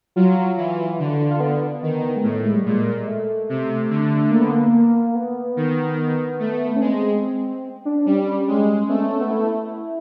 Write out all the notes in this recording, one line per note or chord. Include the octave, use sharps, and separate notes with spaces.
F#3 F4
E3
D3 F#4
F4
F#4
F4
F4
B3
D#3
G#3
A2 A3
G#3
G3
A#2 G#3
A3
C3
D3
A#3
B3
A#3
B3
D#3
A3
C#4
G#3 C4
D4
G3 C#4
G#3
A3 B3
C4
C#4
B3
E4